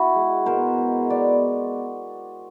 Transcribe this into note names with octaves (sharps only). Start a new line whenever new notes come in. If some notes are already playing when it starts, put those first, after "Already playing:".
Already playing: E4 F#4
G#3
B2 A#4 C5
G#3
B3 D5